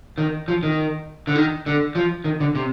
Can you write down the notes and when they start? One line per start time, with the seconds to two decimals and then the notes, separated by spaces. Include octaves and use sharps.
0.18 D#3
0.48 F3
0.63 D#3
1.27 D3
1.36 D#3
1.66 D3
1.95 F3
2.24 D#3
2.40 D3
2.55 C3